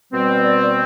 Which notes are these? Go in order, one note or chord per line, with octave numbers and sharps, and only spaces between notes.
B2 G3 C4
D5
D5